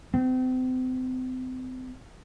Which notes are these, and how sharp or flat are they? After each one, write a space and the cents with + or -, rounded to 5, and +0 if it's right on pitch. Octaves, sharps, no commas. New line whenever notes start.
C4 -35